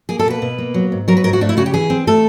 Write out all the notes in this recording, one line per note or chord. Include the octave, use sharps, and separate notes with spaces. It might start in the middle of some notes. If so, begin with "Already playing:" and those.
A#3 G#4
A4
B2 B4
B2
A#3
F#3
G#2
F#3 A#4
B4
G#2 A#4
F#4
A3 D4
E4
C#3 F#4
G4
E3 G#4
C4
A3 A4